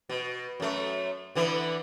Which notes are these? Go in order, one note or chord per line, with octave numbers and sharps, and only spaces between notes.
B2
F#2 A3
D3 E3 B3